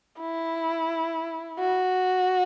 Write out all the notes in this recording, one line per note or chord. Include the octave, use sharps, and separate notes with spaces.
E4
F#4